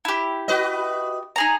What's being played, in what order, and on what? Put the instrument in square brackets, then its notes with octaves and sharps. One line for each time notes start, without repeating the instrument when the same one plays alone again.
[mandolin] E4 G4
[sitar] F#4 B4 D#5
[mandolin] D#4 G#4 A#5